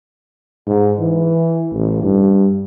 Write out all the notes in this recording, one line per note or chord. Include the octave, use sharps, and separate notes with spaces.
G#2
E3
A1
G2